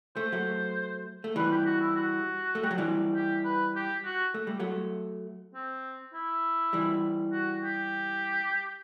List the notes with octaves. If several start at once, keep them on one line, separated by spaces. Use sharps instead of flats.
A3 C5
F#3 A3
A3
E3 G3 B4
G4
F#4
E4
F#4
A3
G3
F#3
E3 G3
G4
B4
G4
F#4
A3
G3
F#3 A3
C4
E4
E3 G3
F#4
G4